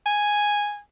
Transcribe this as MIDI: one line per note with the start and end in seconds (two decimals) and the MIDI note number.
0.06 0.79 80